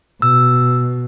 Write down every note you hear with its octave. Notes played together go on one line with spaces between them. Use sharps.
B2 E6